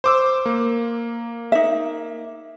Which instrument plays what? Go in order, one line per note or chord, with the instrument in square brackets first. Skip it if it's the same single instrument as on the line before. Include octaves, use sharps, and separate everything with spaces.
[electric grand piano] C5 D6 E6
A#3
[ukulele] D#4 E5